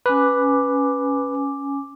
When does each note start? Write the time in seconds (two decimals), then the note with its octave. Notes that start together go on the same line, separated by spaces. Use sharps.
0.06 C#4 B4 G#5 D6